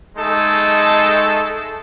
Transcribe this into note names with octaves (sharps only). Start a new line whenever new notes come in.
G#3 A3 D#4 G#4 A4